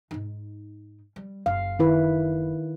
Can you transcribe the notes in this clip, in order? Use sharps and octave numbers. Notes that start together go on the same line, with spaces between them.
G#2 D#4
G3
F#1 F5
D#3 E4 B4